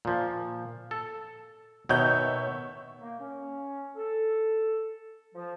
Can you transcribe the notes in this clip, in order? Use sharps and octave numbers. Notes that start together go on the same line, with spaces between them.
A#2 F3
A4
B2 D#3 C#5 E5 G6
A#3
C#4
A4
F3